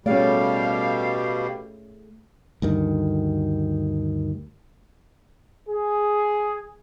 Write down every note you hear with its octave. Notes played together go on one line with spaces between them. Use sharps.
B2 G3 A3 C#4 G#4 D5 F5
D2 G2 D#3
G#4